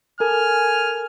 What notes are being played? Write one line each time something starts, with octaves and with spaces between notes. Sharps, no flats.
A4 A#4 G#5 F6